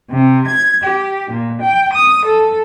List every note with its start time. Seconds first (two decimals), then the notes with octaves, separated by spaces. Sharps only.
0.11 C3
0.48 G#6
0.83 G4
1.31 A#2
1.61 G5
1.93 D#6
2.25 A4